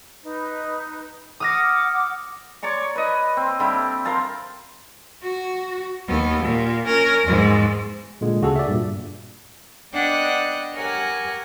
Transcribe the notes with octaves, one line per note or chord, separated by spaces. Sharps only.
D#4 B4
F#5 D6 D#6 F6 A#6
C#5 D5 A#5 C#6
B4 D#5
C4
D3 G3 E4
A#4 C5 F5 A5
F#4
D#2 B3
A#2
C#4 A#4
E2 G#2
A#2 D3 G#3
D2 C#3 F#4 G#4 A4
D5 E5
G2 A#2
B3 D4 D#5 F#5 G5
G4 A#4 C#5 F#5 G#5